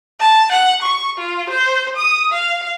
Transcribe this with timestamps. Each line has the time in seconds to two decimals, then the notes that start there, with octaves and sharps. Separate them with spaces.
0.20 A5
0.52 F#5
0.82 C#6
1.18 F4
1.50 C5
1.96 D#6
2.32 F5